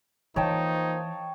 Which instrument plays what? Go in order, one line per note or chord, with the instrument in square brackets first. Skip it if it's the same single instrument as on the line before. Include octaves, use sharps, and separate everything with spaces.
[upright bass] E3 [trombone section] F3 A#3 C5 [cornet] D#4 [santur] C#5 G5 A5